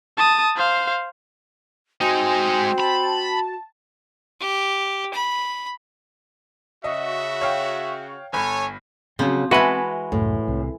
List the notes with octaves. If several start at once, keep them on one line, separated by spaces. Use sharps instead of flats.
A5 D#6
C5 F5
G#3 C4 D#4 F#4 G#5
A5 B5
G4
B5
C#3 F#4 D#5 E5
C#5 F5 G5
G1 A4 C#5 G#5 B5
C#3 F3 F#3 B3 C4
E3 G#3 F#4 B4 E5 A5
C#2 F#2 A2
C2